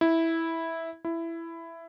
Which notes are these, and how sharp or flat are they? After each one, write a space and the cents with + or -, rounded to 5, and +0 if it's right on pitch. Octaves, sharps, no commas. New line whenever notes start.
E4 -10
E4 +10